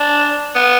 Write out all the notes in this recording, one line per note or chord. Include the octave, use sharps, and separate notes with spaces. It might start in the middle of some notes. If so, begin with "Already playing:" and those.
Already playing: D4
B3